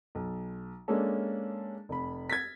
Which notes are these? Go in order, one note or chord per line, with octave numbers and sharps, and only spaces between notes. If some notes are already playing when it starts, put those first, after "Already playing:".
B1
G#3 A#3 C#4 D4 A4
F1 B5
G#6 A6 B6